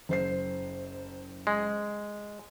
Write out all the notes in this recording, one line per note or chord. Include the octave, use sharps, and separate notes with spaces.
F#1 C5 C7
G#3